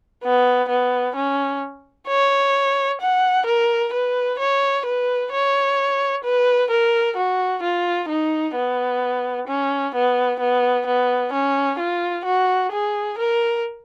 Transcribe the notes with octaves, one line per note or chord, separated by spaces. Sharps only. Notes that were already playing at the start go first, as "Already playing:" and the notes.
B3
B3
C#4
C#5
F#5
A#4
B4
C#5
B4
C#5
B4
A#4
F#4
F4
D#4
B3
C#4
B3
B3
B3
C#4
F4
F#4
G#4
A#4